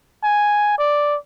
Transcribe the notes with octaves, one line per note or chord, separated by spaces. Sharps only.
G#5
D5